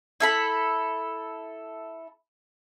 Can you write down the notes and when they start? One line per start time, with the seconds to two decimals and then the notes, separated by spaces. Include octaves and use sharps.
0.20 E4 A4 B5